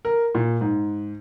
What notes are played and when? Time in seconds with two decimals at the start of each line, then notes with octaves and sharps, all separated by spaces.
0.05 A#4
0.35 A#2
0.61 G#2